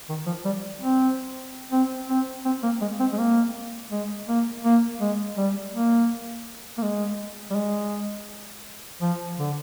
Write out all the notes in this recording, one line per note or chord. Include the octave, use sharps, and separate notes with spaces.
D#3
F3
G3
C4
C4
C4
C4
A#3
G#3
C4
G#3
A#3
G#3
A#3
A#3
G#3
G3
A#3
A#3
G#3
G3
G#3
F3
D3